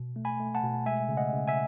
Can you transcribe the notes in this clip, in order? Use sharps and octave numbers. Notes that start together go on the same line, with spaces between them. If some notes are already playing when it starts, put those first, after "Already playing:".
Already playing: B2
A3
G#5 B5
A3
F#5 A5
B2
G#3 E5 G#5
C#3
D#5 F#5
C#3
E5 G#5